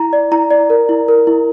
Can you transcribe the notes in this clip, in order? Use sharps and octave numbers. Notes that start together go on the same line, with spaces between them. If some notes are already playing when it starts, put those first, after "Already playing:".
Already playing: E4 A#5
D5
E4 A#5
D5
A#4
E4
A#4
E4